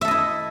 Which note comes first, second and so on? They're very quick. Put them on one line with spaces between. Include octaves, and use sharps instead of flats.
E5 A4 D#5 E4